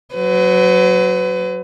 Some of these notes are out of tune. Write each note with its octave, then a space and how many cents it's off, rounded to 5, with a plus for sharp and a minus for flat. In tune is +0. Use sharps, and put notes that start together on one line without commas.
F#3 +0 B4 +40